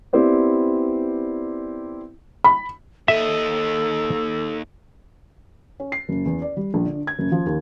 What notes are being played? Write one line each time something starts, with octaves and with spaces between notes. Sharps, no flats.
B3 C4 E4 G4 C5 D5
B5
D#2 A4 D#5 E5
C#4
C7
F#1
E2
D5
G3
A#1
D3
G#6
F#1
F3
D#2